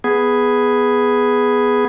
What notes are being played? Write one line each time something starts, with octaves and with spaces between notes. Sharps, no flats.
B3 G#4